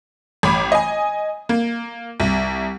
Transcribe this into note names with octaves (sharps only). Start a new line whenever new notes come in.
A1 B5 D6
D#5 G#5
A#3
C2